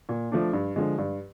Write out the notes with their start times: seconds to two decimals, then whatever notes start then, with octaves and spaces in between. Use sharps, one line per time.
0.09 A#2
0.32 F3 A3 D4
0.53 G2
0.76 D3 F3 G#3
0.98 G2